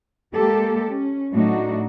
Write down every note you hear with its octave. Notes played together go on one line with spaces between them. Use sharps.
G#3 A#3 G4 A4
C#4
A2 F#3 A3 D4 D#4 F#4